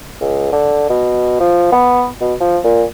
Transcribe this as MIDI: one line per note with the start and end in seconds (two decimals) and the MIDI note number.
0.21 0.52 37
0.52 0.89 50
0.90 1.37 47
1.40 1.70 53
1.72 2.07 59
2.21 2.34 47
2.40 2.58 53
2.64 2.84 46